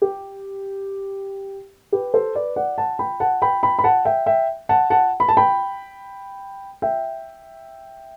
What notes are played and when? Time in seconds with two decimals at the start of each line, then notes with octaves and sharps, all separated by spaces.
0.02 G4
1.92 G4 B4
2.14 A4 C5
2.35 B4 D5
2.56 D5 F#5
2.78 F#5 A5
2.99 G5 B5
3.20 F#5 A5
3.42 G5 B5
3.63 G5 B5
3.79 B5
3.84 F#5 A5
4.05 E5 G5
4.26 E5 G5
4.69 F#5 A5
4.90 F#5 A5
5.20 B5
5.29 A5
5.37 G5 B5
6.82 E5 G5